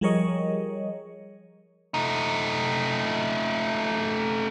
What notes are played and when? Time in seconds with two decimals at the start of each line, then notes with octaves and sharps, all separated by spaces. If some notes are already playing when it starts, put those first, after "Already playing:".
0.01 F3 G3 G#4 A#4 C#5 D#5
1.94 A3 D#4